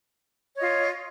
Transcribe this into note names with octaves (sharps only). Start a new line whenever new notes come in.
F4 C#5 D#5